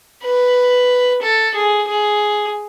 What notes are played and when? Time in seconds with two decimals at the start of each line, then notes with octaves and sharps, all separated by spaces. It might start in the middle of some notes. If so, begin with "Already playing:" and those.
0.24 B4
1.22 A4
1.55 G#4
1.88 G#4